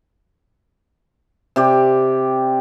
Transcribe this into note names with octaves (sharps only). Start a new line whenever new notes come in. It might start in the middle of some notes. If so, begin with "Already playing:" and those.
C3 G4 D5